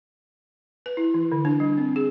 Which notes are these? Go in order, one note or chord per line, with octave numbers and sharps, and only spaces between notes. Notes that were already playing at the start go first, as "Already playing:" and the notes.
B4
E4
E3
D3
D4
G3
C4
G#4